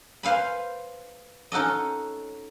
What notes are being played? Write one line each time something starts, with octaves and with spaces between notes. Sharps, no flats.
B4 C5 F5 G#5 B5
C#4 D#4 F#4 A4 D#5